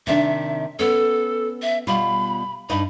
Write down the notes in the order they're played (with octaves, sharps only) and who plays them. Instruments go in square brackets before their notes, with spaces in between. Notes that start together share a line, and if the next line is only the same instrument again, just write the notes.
[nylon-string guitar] C3 D#3 D4 [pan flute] E5
[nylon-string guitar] B3 C#4 [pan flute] A4
[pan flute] E5
[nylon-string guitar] B2 G3 F4 [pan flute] B5
[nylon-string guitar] G2 D#4 D#5 [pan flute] B5